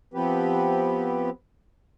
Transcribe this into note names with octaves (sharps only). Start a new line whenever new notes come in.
F3 B3 C4 G4 B4